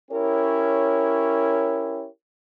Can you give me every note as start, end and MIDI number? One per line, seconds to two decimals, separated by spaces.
0.11 2.08 61
0.11 2.08 64
0.11 2.08 67
0.11 2.08 70
0.11 2.08 73